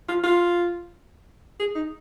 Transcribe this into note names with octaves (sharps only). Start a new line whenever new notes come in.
F4
F4
G#4
D#4